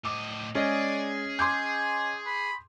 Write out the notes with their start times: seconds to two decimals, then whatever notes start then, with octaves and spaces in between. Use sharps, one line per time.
0.05 A2 D#5 D6
0.55 G#3 C#4 G#4 D5 D#5
1.39 G#5 C6 D6 G6
2.26 B5